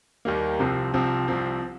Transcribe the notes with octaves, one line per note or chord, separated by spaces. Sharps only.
D#2 D#3 G3 A#3
C2 C3 F3 C4
C2 C3 F3 C4
C2 C3 F3 C4